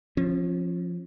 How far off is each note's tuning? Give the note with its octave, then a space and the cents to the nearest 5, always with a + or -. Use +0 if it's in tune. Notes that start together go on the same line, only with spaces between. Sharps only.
F3 +0 C#4 -40